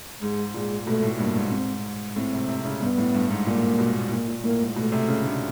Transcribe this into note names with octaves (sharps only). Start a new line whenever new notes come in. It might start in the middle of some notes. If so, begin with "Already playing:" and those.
G#2 G#3
A#2 G#3
B2 A3
A2
G2 A#3
G#2
C4
A2 C4
C3
C3
C#3
G2 B3
A2
G2
G#2
A#2 A#3
B2
A#2 A#3
A#2
A2 A#3
G#2
B2 A3
C3
C#3
D3